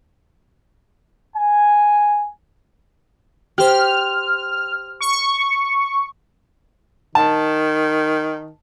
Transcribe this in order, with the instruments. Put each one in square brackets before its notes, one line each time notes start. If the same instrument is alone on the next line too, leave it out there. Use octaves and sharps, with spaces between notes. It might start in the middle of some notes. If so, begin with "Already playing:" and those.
[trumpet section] G#5
[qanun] G4 C5 [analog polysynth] F6
[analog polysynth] C#6
[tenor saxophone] D#3 [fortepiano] A5